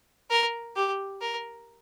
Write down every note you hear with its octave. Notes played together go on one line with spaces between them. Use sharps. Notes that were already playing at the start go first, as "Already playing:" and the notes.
A#4
G4
A#4